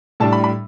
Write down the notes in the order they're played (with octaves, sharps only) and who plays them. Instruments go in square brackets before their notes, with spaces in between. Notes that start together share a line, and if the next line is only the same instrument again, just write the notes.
[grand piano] A2 G3 D4 A5
B5
B5